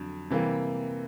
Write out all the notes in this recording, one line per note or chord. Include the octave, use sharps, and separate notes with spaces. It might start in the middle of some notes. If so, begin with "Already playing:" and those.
Already playing: F2 D3 F#3
C3 E3 G3 A#3